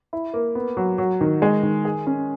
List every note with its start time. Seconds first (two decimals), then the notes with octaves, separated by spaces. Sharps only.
0.13 E4
0.34 A#3
0.55 B3
0.77 F#3
0.98 F#3
1.21 D#3
1.42 G#3
1.63 D#3
1.85 G#4
2.07 C#4